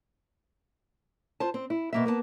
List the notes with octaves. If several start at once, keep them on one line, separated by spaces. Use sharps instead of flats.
F4 C5 A5
C4
E4
B2 A#3 E5
A#3 B3 B4 A5